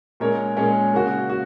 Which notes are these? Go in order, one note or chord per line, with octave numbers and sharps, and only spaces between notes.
A#2 G#3 C#4 A#4 C#5
A#2 G#3 C#4 A#4 C#5
C#3 A#3 F#4
F#4